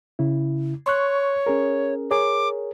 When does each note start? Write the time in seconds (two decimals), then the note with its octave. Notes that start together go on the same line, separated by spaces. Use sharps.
0.19 C#3 E4
0.86 C#5 C6 C#6 F#6
1.47 C#4 G#4 A#4
2.11 G#4 A#4 C#5 D6